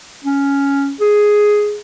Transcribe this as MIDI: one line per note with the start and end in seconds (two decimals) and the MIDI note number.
0.24 0.93 61
1.00 1.79 68